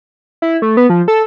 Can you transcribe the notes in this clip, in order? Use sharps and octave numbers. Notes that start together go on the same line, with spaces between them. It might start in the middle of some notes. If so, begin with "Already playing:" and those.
E4
A3
B3
F3
A4